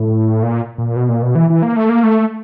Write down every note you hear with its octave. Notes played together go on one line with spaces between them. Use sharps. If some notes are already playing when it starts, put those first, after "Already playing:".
Already playing: A2
A#2
A#2
B2
A#2
B2
E3
E3
A#3
A3
A#3
A3